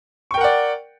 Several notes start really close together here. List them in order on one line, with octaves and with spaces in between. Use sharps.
C#6 G5 A#4 F#5 D5